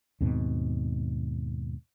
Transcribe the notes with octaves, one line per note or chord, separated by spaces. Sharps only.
D#2 G#2 B2 C4